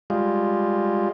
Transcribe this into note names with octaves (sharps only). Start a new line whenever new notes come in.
G3 G#3 F4